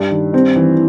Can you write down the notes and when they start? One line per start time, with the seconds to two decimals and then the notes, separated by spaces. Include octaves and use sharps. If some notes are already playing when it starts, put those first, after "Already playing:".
Already playing: G2
0.11 D#3
0.33 G2 C4
0.56 E3